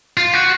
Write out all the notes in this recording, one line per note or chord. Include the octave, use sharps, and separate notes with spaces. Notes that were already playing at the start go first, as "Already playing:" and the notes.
F4
F#4